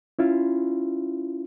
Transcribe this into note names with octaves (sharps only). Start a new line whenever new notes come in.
C#4 E4 F4